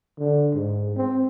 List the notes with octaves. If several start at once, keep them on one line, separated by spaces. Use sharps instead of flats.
D3
G#2
C4